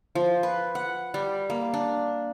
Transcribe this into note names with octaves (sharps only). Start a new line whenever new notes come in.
F3
B4
F#5
G3
A#3
D4